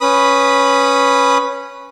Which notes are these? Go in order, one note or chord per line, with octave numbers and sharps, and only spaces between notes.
C#4 B4 B5 D#6